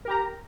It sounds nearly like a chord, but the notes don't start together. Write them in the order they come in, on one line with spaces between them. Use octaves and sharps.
A#4 G4 A#5